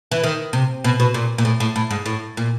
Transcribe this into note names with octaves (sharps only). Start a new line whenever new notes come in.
E3
D#3
C3
B2
B2
A#2
A#2
A2
A2
A2
G#2
A2
A#2